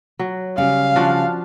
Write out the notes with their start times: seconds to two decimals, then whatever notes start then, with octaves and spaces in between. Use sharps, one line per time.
0.19 F#3
0.58 C#3 G3 F5
0.96 F3 D4 F#4